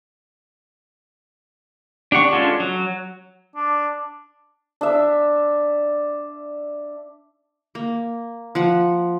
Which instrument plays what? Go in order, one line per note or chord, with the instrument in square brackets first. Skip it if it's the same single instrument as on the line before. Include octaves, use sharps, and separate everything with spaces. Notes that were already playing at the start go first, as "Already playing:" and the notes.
[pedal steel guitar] D4 G4 F#5 C#6
G#3 C#4 D4 F4 A4
F#3
[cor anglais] D4
[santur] D4 E5
[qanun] A#3
F3 F#5